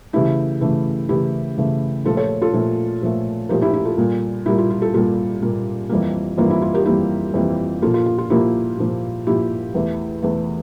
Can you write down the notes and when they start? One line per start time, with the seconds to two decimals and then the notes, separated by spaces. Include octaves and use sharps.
0.13 C#3 E3 A3 E4 G4
0.61 C#3 E3 A3
1.09 C#3 E3 A3 E4 G4
1.57 C#3 E3 A3
2.05 A#2 F3 A3 F4 A4
2.17 A4 C#5
2.42 F4 A4
2.53 A#2 F3 A3
3.02 A#2 F3 A3
3.49 A#2 F3 A3 G4 A#4
3.62 E4 G4
3.73 E4 G4
3.85 F4 A4
3.98 A#2 G3 A#3
4.46 A#2 G3 A#3 E4 G4
4.58 F4
4.70 F4
4.82 F4 A4
4.94 A#2 G3 A#3 F4 A4
5.42 A#2 G3 A#3
5.89 F2 E3 G3 A#3
6.38 F2 E3 G3 A#3 F4
6.50 E4
6.62 F4
6.74 G4 A#4
6.86 F2 E3 G3 A#3 E4 G4
7.34 F2 E3 G3 A#3
7.82 A#2 F3 A#3 F4 A4
7.94 F4
8.06 F4
8.18 F4
8.30 A#2 F3 A#3 E4 G4
8.78 A#2 F3 A#3
9.27 A#2 F3 A#3 E4 G4
9.75 E2 E3 A3
10.23 E2 E3 A3